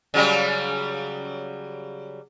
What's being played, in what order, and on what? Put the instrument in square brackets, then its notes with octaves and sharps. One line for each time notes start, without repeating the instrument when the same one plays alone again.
[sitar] C#3 F#3 G3